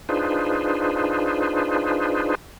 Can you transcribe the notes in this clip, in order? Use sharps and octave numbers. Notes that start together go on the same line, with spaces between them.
D4 D#4 F4 G#4 B4 C5